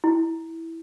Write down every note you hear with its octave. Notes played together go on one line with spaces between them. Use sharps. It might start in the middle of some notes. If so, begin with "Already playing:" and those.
E4